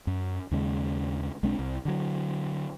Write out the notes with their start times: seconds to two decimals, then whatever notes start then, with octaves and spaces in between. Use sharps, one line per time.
0.07 F#2
0.51 D#2 C#3 G#3
1.43 B1 G#3 C4 D4
1.59 C2
1.85 D3 F#3